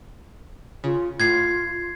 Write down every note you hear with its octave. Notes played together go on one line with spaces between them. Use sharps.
C#3 F4
A2 F4 G#6 C7